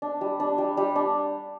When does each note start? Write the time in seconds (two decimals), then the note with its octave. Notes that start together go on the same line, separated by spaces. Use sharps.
0.02 D4
0.21 G3
0.40 D4
0.58 G3
0.77 G3
0.96 D4